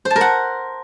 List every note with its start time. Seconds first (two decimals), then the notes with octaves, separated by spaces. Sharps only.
0.05 C5
0.10 A5
0.16 A#4
0.21 F#5